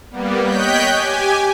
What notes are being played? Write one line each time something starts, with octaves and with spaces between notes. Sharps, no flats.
G3 A#3 B3
C#5 D#5 G5 F#6 G6 B6
G4 G#5